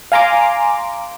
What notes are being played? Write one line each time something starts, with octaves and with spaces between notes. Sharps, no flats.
F5 G#5 A#5 C6 D6